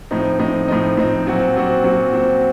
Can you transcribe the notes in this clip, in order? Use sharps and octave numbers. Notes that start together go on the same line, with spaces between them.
A2 F3 C4 D#4
A2 F3 C4 D#4
A2 F3 C4 D#4
A2 F3 C4 D#4
A#2 F#3 C4 F#4
A#2 F#3 C4 F#4
A#2 F#3 C4 F#4
A#2 F#3 C4 F#4